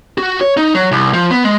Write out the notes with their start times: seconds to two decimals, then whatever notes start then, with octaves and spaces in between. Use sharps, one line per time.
0.18 F#4
0.41 C#5
0.57 D#4
0.75 F#3
0.92 C2
1.13 F3
1.31 B3
1.45 G#3